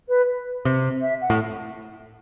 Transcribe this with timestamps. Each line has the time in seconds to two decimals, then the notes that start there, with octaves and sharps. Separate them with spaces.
0.09 B4
0.65 C3
1.02 E5
1.21 F#5
1.30 A2